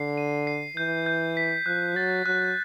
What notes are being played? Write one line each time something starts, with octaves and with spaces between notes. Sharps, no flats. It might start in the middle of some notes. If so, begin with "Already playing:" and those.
Already playing: D3 C7
D#7
C7
E3 G6
G6
B6
F3 F#6
F#3 A6
F#3 F#6